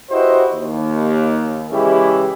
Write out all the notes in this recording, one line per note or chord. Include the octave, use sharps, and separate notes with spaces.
E4 F#4 G4 B4 C5 D#5
D#2
C#3 E3 G#3 E4 G4 C#5